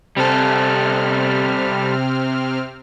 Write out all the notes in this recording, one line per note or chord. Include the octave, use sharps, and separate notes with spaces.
C3 G3 C4 A4 F6